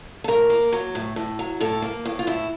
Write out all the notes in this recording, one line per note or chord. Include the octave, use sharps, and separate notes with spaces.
A4
A2 A#4
A#3
F#3
A2
A2
F#3
A2 A4
A#3
A2
F4
A2 E4